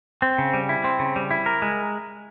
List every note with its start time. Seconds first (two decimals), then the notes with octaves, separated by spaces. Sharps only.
0.22 C4
0.38 C#3
0.53 G3
0.69 E4
0.84 C4
0.99 C#3
1.16 G3
1.31 E4
1.46 A#4
1.62 G#3